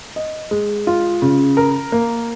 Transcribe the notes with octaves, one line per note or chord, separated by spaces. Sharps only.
D#5
G#3
F4
C#3
A#4
A#3